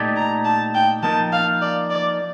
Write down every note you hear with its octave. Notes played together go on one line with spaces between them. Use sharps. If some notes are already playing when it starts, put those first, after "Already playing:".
Already playing: A#2 A3 D#4 G4 D5
A#5
A5
G5
F3 A#3 D#4 A5
F5
D5
D5